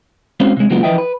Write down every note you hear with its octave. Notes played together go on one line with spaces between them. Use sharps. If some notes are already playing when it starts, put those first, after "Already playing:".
G#3 C4 C#4 F#4 C5 F5
C3 G#3
C#3 F#3 G#3 A#3 B3 F4
E3 F3 B4 D#5 E5 G5
B4